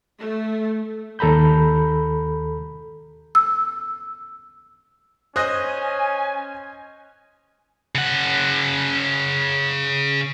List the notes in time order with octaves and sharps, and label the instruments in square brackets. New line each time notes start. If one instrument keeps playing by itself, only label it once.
[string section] A3
[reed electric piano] D#2 A4 A#5 B5 G6
[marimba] E6
[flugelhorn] C#4 [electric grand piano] C5 D#5 [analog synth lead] G#5 [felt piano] D#6 F#6 A#6
[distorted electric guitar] C#3 F#5